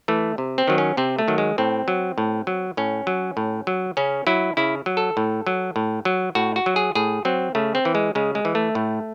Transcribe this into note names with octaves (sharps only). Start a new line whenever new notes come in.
E3 A3
C3
C4
D#3 F#3
C#4
C3 C4
A3
D#3 F#3
G#3
A2 C4
F#3
A2
F#3
A2 C#4
F#3
A2
F#3
C#3 C#4
F#3 E4
C#3 E4
F#3
A4
A2
F#3
A2
F#3
A2 F#4
F#4
F#3
G#4
A2 G#4
F#3 C4
C#3 A3
C4
E3
G#3
C#3 G#3
G#3
E3
A3
A2